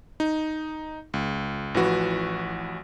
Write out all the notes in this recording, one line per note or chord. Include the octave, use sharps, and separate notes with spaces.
D#4
C#2
A1 E3 F3 F#4 B4